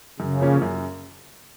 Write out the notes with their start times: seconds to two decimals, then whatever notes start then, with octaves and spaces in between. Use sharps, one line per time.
0.20 F#2 C#3
0.41 F3 A#3 C#4
0.62 F#2